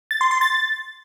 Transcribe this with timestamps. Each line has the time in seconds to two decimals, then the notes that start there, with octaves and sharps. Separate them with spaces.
0.11 A6
0.21 C6
0.31 C6
0.41 A6